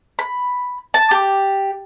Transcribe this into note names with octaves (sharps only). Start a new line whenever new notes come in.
B5
A5
G4